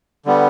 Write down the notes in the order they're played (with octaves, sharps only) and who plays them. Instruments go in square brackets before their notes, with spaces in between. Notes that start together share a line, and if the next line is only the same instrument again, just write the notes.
[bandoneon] D3 G3 B3